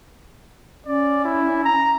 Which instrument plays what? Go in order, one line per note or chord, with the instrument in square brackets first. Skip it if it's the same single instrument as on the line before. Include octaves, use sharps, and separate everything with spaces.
[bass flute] C#4 [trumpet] D5
[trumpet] E4
A#5